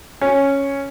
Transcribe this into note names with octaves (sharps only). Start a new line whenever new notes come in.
C#4